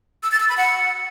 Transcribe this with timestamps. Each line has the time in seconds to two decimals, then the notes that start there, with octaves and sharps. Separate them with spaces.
0.23 E6
0.32 A6
0.40 E6
0.49 B5
0.58 F#5